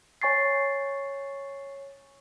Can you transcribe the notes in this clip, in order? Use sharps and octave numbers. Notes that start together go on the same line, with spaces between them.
C#5 G#5 C#6 A6 C7